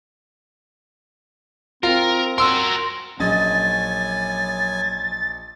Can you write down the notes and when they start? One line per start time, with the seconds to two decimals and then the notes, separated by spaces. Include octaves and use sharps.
1.83 C4 F4 A#4
2.38 F#4 A#4 C6 E6
3.20 A#1 F#3 C#4 D#5 G#5 A6